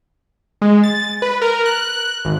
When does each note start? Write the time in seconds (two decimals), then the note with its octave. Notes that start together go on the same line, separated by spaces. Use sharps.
0.62 G#3
0.84 A6
1.22 B4
1.42 A#4
1.66 F#6
2.25 G#1